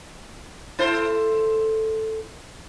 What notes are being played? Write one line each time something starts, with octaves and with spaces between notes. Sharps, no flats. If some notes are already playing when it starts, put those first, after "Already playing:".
E4 A4 C5